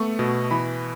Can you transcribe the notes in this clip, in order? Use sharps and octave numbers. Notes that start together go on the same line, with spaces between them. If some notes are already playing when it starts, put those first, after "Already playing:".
Already playing: A3 B3 C#6
B2
E3 B5